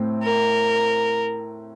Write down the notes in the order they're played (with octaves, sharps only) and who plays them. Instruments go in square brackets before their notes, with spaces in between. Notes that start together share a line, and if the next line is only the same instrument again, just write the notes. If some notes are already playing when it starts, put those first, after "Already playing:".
Already playing: [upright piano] A2 A3 C4
[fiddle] A#4